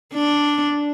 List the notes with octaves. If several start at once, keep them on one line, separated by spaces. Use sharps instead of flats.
D4